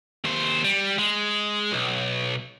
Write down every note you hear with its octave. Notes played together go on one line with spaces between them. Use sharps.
D#2 C5
G3
G#3
B1